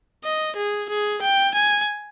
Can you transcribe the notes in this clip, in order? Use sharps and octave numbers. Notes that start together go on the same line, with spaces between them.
D#5
G#4
G#4
G5
G#5